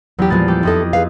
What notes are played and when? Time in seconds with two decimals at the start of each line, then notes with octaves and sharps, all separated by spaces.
0.19 E2 F#3 B3 G4
0.30 A#2 F3 G3 G#3 B3 A6
0.48 G4 A4 D6
0.63 F2 D#4 E4 A4 D#5
0.93 G#4 B4 F5